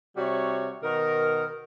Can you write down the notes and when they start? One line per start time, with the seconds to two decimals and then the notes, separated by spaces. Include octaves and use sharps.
0.17 C3 G3 F#4 C#5
0.84 B2 D#3 A#4